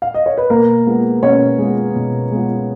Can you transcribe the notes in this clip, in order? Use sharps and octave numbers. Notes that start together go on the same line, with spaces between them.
F5
D#5
C#5
B4
B2 A#3 A#4
G#3 B3 F4
B2 C#4 C#5
G#3 B3 F4
B2
G#3 B3 F4